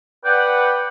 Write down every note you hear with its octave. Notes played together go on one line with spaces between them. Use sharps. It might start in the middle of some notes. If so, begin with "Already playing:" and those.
B4 D5 F#5 G5